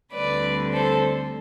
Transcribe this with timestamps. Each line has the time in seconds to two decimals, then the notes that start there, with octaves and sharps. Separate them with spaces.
0.12 D2 D3 G3 C4 B4 D5
0.73 A4 C5